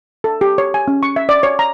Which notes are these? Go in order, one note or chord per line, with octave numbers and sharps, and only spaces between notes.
A4
G4
C#5
G#5
C#4
C#6
E5
D5
C#5
A#5